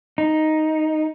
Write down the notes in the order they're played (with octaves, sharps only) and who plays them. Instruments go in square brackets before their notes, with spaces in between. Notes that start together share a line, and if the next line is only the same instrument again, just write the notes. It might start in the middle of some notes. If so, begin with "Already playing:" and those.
[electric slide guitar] D#4